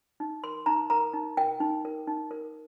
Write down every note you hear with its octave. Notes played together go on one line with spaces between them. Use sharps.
D#4
A#4 C6
D#4 A#5
A#4 A#5
D#4
A#4 G5
D#4
A#4
D#4
A#4